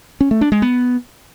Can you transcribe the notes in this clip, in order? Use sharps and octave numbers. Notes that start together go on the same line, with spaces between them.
C#4
A3
D4
G#3
B3